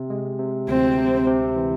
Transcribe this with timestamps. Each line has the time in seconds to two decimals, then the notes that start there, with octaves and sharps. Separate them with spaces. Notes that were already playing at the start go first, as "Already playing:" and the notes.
Already playing: C3
0.10 G#3
0.39 C3
0.68 D2 C4
0.98 C3
1.27 C3
1.56 E3